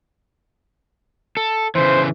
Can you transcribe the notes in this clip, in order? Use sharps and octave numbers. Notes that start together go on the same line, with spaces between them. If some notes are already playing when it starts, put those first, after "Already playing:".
A4
C#3 E3 C5